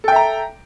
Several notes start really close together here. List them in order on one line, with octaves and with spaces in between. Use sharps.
A4 G5 E5 A#5